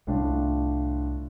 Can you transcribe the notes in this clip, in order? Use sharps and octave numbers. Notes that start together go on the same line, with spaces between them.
C2 A2 D4 F4